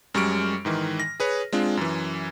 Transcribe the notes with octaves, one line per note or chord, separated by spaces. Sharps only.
F#2 G3 G#3 C#6 F6 D7
G#2 D#3 E3
A#6
G#4 B4 C#5
G#3 C4 D4 F4
F#2 E3